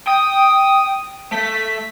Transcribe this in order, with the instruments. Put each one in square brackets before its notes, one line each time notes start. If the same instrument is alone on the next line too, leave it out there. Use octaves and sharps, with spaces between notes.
[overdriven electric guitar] G5 [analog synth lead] D#6
[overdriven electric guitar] A3 [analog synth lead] B6